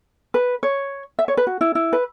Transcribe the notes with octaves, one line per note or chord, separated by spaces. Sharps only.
B4
C#5
E5
C#5
B4
F#4
E4
E4
B4